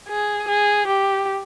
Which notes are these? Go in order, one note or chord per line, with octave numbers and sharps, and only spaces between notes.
G#4
G#4
G4